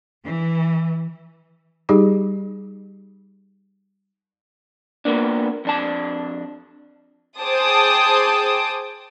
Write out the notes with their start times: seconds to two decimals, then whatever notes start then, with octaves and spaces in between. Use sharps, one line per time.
0.24 E3
1.89 G3 D#4 G4 G#4
5.05 A#3 B3 D4
5.65 F2 D4 A5
7.41 G#4 C5 G5 A5 D6 D#6